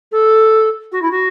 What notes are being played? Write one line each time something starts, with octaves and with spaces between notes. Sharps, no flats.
A4
F#4
E4
F#4